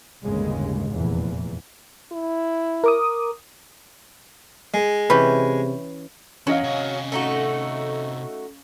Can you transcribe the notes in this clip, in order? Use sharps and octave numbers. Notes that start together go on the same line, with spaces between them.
G1 D#2 A2 C#3 G#3
F1 E2 A#2 E3
E4
A#4 D6 D#6
G#3
C3 E3 C#4 G4 B4
E2 F#3 C#4 D#5 F5
C3 G#4
A3 D#4 F#4